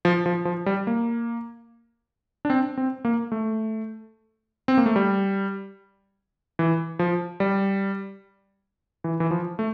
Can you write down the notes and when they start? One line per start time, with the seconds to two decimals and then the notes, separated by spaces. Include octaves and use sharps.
0.05 F3
0.26 F3
0.45 F3
0.66 G3
0.87 A#3
2.45 D4
2.50 C4
2.77 C4
3.05 A#3
3.32 A3
4.68 C4
4.78 A#3
4.86 A3
4.96 G3
6.59 E3
6.99 F3
7.40 G3
9.04 E3
9.20 E3
9.31 F3
9.59 A3